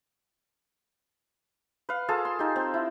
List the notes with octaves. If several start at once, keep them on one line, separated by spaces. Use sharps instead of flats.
B4 F5
F4 G#4 A4 A5
C6
D#4 G4
C4
E4